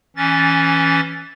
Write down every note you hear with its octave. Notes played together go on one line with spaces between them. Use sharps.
E3 C#4 A6